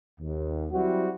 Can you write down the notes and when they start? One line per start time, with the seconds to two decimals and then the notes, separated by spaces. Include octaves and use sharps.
0.21 D#2
0.72 F#3 G3 C4 E4 F#4